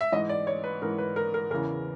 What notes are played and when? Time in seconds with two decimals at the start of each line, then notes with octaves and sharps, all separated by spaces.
0.01 E5
0.12 G#2 E3 D#5
0.29 D5
0.47 C#5
0.64 B4
0.81 G#2 E3 A#4
0.98 B4
1.16 A#4
1.34 A#4
1.50 E2 C#3 E3 A#4